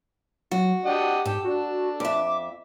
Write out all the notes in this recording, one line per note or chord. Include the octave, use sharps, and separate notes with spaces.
F#3 F#4
D4 G4 D#5 F#5
G#2 G4 A4
D4 F#4
F2 E5 D6